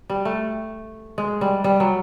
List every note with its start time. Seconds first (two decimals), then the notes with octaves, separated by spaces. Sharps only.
0.10 G3
0.25 A3
1.18 G#3
1.41 G3
1.64 G3
1.80 F#3